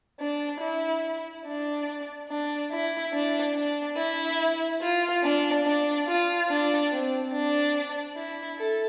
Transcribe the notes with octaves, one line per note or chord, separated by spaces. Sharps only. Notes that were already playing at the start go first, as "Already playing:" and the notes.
D4
E4
D4
D4
E4
D4
D4
E4
F4
D4
D4
F4
D4
C4
D4
E4
A4